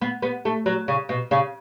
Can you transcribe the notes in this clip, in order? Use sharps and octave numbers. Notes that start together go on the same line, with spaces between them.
B3
B3
A3
F#3
C#3
B2
C#3